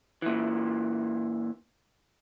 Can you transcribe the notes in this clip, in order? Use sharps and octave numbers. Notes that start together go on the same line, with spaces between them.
A#2 E3